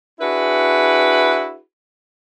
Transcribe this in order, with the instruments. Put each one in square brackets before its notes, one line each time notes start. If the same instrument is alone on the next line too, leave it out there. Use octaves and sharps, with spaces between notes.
[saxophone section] D4 E4 F#4 G#4 B4